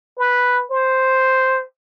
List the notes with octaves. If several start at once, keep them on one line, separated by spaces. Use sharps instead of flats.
B4
C5